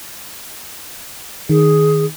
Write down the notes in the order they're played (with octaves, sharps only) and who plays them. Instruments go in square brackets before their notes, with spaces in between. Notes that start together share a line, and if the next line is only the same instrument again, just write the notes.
[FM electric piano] D#3 [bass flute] G#4